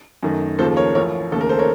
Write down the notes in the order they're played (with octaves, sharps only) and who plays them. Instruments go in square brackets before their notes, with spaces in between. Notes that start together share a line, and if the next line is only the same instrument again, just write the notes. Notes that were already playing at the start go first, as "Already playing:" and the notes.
[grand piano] F#2 D#3 A3
D#2 C#3 F3 A4 C5
A#4 C#5
A1 A2 F3 A#4 C#5
D#2 C#3 A3 A4
A#4
A4 C5
A#4 C#5